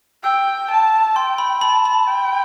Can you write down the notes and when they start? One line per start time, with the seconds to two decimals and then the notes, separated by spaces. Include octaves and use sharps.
0.23 G5 E6
0.70 A5
1.16 G5 C6
1.38 B5
1.61 A5 B5
1.85 B5
2.08 G5